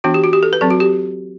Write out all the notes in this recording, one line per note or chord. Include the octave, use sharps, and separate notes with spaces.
E3 B3 D4 F#4
G4
F#4
G4
A4
B4
F#3 C4 A4
F#4
G4